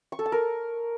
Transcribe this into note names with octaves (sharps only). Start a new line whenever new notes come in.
C#6
A4
A5
A#4